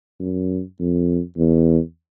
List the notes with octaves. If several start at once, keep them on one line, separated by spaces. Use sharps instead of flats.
F#2
F2
E2